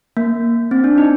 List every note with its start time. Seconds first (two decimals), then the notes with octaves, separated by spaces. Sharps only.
0.17 A#3
0.71 C4
0.84 D4
0.98 D#4